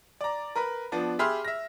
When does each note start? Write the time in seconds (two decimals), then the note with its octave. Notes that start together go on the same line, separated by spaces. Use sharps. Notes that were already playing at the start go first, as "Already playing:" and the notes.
0.21 D5 A#5
0.55 A#4 B4 B5
0.92 F3 B3 D4
1.19 G4 G#4 E5 B5 C6 F6
1.45 E5 A#6